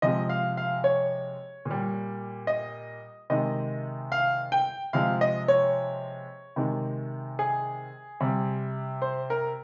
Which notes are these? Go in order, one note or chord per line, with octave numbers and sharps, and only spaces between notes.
C3 F3 G#3 D#5
F5
F5
C#5
A#2
G3
D#5
C3 D#3 G#3 D#5
F5
G5
C3 F3 G#3 F5
D#5
C#5
C3 D#3 G#3
G#4
C3 G3
C5
A#4